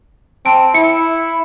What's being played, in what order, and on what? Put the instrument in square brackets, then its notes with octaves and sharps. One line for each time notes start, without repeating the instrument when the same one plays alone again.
[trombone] C4 [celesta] A5 D7
[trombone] E4 [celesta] C#7